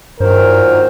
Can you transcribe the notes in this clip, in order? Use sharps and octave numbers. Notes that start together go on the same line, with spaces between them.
G2 A#2 D#3 F#3 A#4 C5